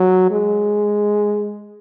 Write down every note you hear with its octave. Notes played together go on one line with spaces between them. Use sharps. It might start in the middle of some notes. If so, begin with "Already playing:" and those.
Already playing: F#3
G#3